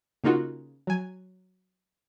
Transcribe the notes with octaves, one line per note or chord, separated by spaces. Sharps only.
C#3 A#3 D#4 F4 F#4
F#3 G#5